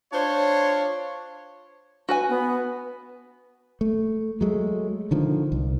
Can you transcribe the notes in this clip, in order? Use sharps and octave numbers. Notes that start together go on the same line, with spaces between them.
D4 F4 C5 C#5
F#4 B4 G#5
B3
A3
F#3 G#3 A3
D3 D#3 F3
C2